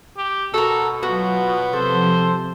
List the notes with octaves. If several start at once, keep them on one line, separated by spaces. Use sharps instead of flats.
G4
B2 F#4 A4 A#4
F#3 B3 F4 F#4
C3 F3 A4 C5